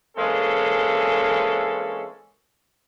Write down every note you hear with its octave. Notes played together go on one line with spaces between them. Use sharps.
E3 G#3 A#3 C4 C#4 A4